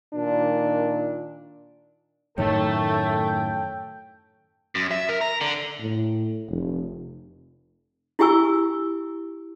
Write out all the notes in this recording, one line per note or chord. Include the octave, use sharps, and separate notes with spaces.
A#2 D#3 D4
F#2 A2 D#3 A3 A4 C#5 G5
F#2
E5
A#4
A#5
D3
A2
F1
E4 F4 G4 G#5 C#6 E6